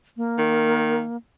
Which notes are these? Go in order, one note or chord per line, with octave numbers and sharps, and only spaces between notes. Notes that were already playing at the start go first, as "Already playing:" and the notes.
A#3
D#3